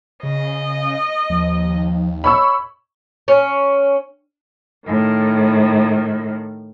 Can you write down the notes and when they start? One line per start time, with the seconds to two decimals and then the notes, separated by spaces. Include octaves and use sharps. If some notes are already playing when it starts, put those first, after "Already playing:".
0.23 C#3 D#5
1.30 D#2 F3
2.24 C#5 B5 C#6 E6
3.28 C#4
4.87 A2 D#3